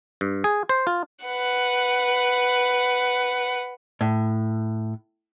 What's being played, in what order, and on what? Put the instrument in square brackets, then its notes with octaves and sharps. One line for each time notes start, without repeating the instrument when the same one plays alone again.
[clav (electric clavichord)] G2
G#4
C5
F4
[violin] B4 F#5
[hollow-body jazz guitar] A2